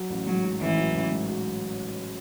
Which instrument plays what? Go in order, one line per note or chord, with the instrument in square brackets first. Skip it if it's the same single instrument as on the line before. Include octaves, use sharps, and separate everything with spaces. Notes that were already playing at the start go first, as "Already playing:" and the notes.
Already playing: [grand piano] F#3
A1
[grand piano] G#2 [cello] F#3
[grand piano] F#3
[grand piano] A1 [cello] E3
[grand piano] F#3
A1
G#2
F#3